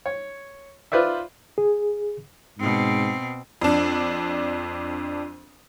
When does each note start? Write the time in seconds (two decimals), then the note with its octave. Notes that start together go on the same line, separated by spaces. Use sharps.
0.06 C#5
0.92 F4 B4 C5 D5 E5
1.58 G#4
2.59 G#2 B2 C4
3.61 F2 D4